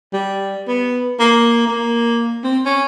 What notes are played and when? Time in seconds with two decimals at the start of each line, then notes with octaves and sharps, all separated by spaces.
0.13 G3
0.67 B3
1.19 A#3
1.67 A#3
2.44 C4
2.66 C#4